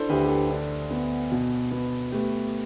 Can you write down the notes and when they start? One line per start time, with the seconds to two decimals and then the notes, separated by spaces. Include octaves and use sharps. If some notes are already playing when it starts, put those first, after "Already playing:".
Already playing: D4 E4 A4 C5
0.09 D2 G4 B4
0.24 G4
0.29 A4
0.51 D4
0.91 B3
1.31 B2
1.71 B3
2.12 A3 G4 B4